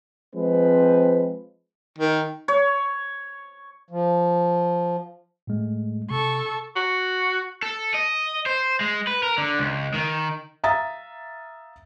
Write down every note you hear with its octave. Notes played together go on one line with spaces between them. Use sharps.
F3 G#3 C4 B4
D#3
C#5
F3
A2 G#3 A3
C3 A4 C#6
F#4
A4
D#5
C5
G#3
B4
A#4
D3
C#2
D#3
E5 F5 A#5 D#6 A6